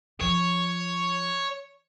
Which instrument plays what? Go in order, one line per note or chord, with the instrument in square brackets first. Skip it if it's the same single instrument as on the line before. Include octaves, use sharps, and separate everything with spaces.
[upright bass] F3 [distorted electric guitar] C#5